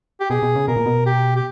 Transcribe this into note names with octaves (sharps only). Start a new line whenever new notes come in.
G4
B2 G#4
B2
C#3
B2 A#4
A#2
B2
G4
G4